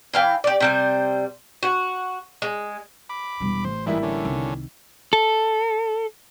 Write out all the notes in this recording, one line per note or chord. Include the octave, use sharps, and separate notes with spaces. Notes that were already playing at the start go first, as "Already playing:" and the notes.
E3 F5 G5
G4 D5
C3 G3 C5
F#4
G#3
B5 D6
E1 G3
A1 C5
G#2 E3 G3 A#3 E4
D3 C#4
C2 D#3
A4